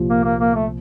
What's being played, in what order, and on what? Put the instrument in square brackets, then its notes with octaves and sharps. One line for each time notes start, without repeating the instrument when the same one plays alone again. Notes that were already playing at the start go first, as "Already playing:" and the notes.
Already playing: [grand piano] C2 A#2 F3
[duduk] A#3
A#3
A#3
A3